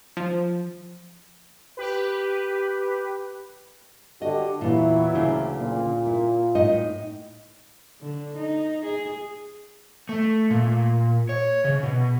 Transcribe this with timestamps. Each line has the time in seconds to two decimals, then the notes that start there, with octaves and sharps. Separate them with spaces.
0.17 F3
1.77 G4 B4
4.22 D3 F#4 G4 D#5
4.61 E2 A#2 E3 F#3 E4
5.15 D2 C#3 D4
5.57 A#2
6.07 E4
6.55 A2 D#4 D#5
8.01 D3
8.37 D#4
8.85 G#4
10.09 A3
10.50 A#2
11.29 C#5
11.64 C#3
11.83 B2